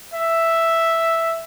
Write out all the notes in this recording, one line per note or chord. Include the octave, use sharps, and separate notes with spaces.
E5